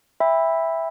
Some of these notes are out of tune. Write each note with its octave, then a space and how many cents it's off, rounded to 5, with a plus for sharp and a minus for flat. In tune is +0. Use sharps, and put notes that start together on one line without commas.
E5 +0 G5 +35 B5 +0